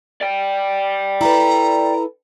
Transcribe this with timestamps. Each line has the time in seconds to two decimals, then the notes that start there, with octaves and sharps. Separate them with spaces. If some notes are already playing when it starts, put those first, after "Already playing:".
0.21 D5 G5
1.21 E4 A4 B4 A#5